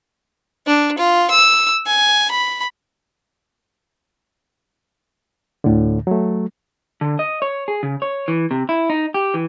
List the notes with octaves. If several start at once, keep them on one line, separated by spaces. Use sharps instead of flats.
D4
F4
E6
G#5
B5
D2 A2 D3
F#3 A3
D3
D#5
C#5
G#4
C#3
C#5
E3
C3
E4
D#4
G4
E3